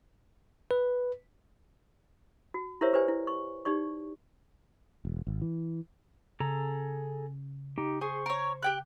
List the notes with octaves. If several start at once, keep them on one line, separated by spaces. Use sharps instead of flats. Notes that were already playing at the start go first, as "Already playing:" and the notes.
B4
F#4
E4 G4 A#4 C5 C#5 E5
G4 B4 C5 D5 G#5
E4
C#6
D#4 G4 D5 C#6
E1
G#1
E3
C#3 G#4 A4 A#5
D#4 G4
G#4 C5 C#6
A#4 C#5
G4 G5 F#6